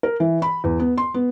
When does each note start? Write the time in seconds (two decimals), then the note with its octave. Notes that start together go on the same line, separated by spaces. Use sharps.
0.03 A#4
0.20 E3
0.42 B5
0.64 E2
0.80 B3
0.98 C6
1.14 B3